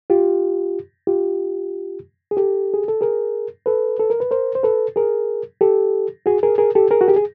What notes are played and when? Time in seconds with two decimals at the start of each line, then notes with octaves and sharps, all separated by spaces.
0.10 F4 G4
1.07 F4 G4
2.31 G#4
2.37 G4 A4
2.74 G#4
2.88 A4
3.01 G#4 A#4
3.66 A4 B4
4.00 A4
4.10 A#4
4.20 B4
4.31 A#4 C5
4.55 C5
4.63 A4 B4
4.96 G#4 A#4
5.61 G4 A4
6.26 F#4 G#4
6.43 G#4 A#4
6.58 G#4 A#4
6.75 G4 A4
6.91 G#4 A#4
7.01 F#4
7.08 G4
7.16 G#4